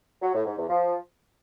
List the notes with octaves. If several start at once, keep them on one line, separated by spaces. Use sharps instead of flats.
F#3
A2
G#2
E2
F3